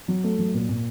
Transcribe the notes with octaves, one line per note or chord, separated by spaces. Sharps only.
F#3
A3
F#3
A#2
A#2